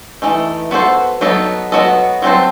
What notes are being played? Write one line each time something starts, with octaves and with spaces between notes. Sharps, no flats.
E3 A3 D#4
B3 F#4 A4 C5
F#3 B3 D#4 A4
F#3 B3 F#4 A4 D#5
F#3 C4 F#4 A4 C5